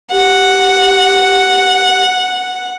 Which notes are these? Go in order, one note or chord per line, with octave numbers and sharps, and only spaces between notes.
G4 F#5